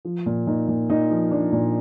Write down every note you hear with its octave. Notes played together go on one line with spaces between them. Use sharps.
F3
A#2
A#2 D#4
A#2
A#2 D#4
F3
F3 D4
A#2